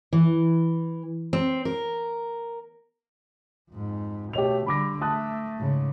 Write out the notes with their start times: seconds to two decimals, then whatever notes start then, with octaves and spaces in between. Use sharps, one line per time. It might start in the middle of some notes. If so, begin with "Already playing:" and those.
0.13 E3
1.33 C4
1.65 A#4
3.71 F2 G#2
4.33 B2 A3 G4 C#5 F7
4.66 D3 G3 B5 D6 A#6
5.01 A3 A5 D#6 F#6
5.58 G#2 C#3